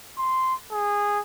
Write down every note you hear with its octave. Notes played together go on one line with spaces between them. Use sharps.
C6
G#4